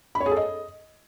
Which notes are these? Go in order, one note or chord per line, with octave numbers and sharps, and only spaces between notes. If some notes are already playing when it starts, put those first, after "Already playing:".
B5
C#5
G#4
A4
D#5